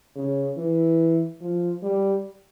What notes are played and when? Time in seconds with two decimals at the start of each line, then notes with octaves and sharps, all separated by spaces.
0.16 C#3
0.58 E3
1.41 F3
1.82 G3